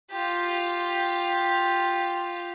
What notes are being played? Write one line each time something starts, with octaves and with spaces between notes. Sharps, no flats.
F4 G4